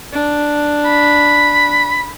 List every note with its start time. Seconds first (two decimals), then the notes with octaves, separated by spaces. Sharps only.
0.12 D4
0.85 B5